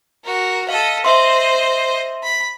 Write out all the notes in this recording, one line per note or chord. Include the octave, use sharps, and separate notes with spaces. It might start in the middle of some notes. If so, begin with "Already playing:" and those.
F#4 A#4
A4 D#5 F5
C5 D#5 E5 C6
B5